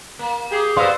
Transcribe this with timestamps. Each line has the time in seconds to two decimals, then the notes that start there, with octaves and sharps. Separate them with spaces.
0.19 A#3
0.51 G4 G#4
0.77 B3 A#4 C5 D5 F5 C6 E6